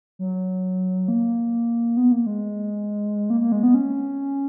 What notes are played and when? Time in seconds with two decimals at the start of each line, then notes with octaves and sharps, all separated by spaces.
0.19 F#3
1.08 A#3
1.97 B3
2.12 A#3
2.26 G#3
3.30 A#3
3.40 A#3
3.52 G#3
3.63 B3
3.74 C#4